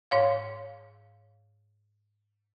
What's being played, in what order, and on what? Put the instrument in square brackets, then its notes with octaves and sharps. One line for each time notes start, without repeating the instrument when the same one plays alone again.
[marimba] G#2 C#5 F5